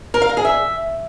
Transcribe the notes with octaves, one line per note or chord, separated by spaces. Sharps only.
A#4
F5
A#4
G#4
E5